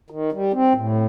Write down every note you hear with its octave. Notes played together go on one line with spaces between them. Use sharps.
D#3
G3
C4
A2